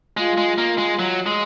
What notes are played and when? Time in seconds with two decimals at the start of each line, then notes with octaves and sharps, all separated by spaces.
0.17 G#3 F4
0.37 G#3
0.58 A#3
0.78 G#3
0.99 F#3
1.26 G#3